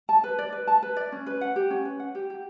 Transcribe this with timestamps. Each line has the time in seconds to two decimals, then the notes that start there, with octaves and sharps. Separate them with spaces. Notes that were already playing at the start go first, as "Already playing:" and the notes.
0.09 A5
0.24 B4
0.39 D5
0.52 B4
0.67 A5
0.83 B4
0.97 D5
1.12 C#4
1.27 B4
1.41 F#5
1.56 G4
1.71 C#4
1.85 B4
2.00 F#5
2.15 G4
2.30 G4